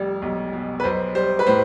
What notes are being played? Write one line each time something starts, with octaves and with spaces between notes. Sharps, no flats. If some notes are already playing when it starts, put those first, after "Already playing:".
Already playing: F1 G3
B1
B2
B4
B1 C5
G3 C5
B4
A2 C5